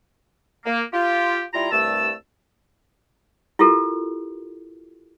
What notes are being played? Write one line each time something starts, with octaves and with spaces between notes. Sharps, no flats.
A#3
F4 G4
G3 E4 F4 A#5
C2 G2 A3 A5 E6
E4 F4 G4 A4 A#4